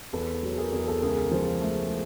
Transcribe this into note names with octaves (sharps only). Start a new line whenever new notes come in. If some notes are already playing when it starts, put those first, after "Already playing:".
E2 A4 B4
F#3
G#4 A#4
E2 G#4
A4
C#2 G#4 A#4
F3
A3